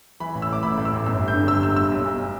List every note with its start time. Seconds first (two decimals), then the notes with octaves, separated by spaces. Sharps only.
0.20 E3 B5
0.35 A1
0.42 E6
0.49 A2 D6
0.63 A1 B5
0.77 A2
0.85 E6
0.92 A1
1.06 G1 E6
1.20 G2
1.28 G6
1.34 D3
1.48 G3 E6
1.63 G1 E6
1.76 G2 E6
1.92 B1
2.05 B1